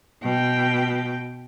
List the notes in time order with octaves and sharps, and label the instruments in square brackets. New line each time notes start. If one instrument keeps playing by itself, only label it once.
[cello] B2 G5